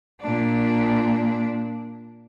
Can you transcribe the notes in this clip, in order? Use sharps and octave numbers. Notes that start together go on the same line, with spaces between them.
A#2 D4